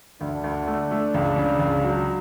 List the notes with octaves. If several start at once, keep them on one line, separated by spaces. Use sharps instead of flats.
D2 D4
D2
A3
A3
C#2
C#3
C#2
F#3